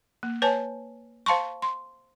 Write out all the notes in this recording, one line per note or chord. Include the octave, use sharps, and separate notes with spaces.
A#3
B4 C#5 G#5 A5
C5 F5 A5 C6 C#6
C6